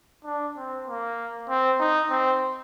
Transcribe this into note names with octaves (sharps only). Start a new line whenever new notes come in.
D4
C4
A#3
C4
D#4
C4